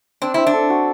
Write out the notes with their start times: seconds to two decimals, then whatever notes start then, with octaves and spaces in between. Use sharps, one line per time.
0.22 C4 D4
0.34 C4 E4
0.47 D4
0.54 A4
0.70 F#4